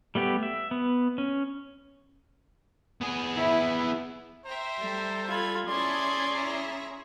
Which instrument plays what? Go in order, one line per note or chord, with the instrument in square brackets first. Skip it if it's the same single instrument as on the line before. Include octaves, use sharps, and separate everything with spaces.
[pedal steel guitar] G3 A3 B3 G4
E5
B3
C#4
[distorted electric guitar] B3 G#4
[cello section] E4
[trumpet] C5 [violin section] E5 G5 A#5
[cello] G3 A4
[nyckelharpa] F4 B5 [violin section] G#6
[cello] C#4 G#4 [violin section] E4 A5 G#6 [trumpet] D5 [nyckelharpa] C6
[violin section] E4 E5 A#5